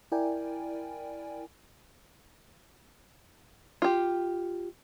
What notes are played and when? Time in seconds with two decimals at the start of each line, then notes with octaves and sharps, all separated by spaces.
0.12 E4 A#4 D5 G5 G#5
3.82 F4 G4